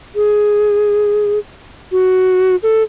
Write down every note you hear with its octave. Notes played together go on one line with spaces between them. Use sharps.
G#4
F#4
A4